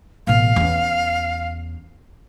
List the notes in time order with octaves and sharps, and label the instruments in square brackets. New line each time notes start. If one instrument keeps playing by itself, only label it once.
[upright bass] A1 B2 [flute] F5
[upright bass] E2 C#4